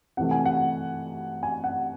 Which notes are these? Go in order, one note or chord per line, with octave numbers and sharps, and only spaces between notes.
C3 E3 A3 F#5
G#5
F#5
G#5
F#5